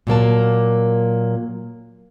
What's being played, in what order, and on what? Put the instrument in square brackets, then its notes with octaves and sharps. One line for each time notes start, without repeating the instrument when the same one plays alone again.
[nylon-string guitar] A#2 F#3 A#3 A5